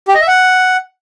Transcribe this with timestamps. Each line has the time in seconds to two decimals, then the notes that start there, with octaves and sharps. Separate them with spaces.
0.08 G4
0.15 D#5
0.21 E5
0.28 F#5